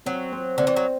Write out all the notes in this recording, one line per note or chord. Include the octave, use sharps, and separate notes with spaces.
F#3 C4
C4
D3 C4
E3
F#3